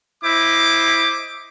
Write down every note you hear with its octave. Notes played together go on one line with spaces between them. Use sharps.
E4 C5 D#5 D6